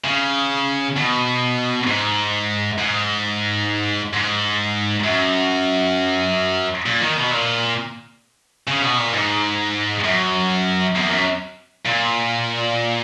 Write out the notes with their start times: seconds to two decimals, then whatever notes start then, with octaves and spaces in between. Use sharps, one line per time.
0.05 C#3
0.96 B2
1.87 G#2
2.78 G#2
4.13 G#2
5.04 F#2
6.86 A#2
7.01 D#3
7.17 B2
7.32 A#2
8.68 C#3
8.82 B2
8.98 A#2
9.14 G#2
10.05 F#2
10.95 E2
11.09 F#2
11.85 A#2